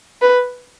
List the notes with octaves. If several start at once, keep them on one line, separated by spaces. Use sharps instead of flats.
B4